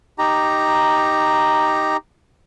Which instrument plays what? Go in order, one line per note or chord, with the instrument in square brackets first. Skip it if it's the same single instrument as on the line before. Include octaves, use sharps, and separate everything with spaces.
[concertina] D#4 G4 A#5